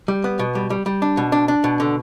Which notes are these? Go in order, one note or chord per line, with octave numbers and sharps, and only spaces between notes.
G3
B3
B2
G3
G3
G3
D4
B2
D4
D4
B2
D3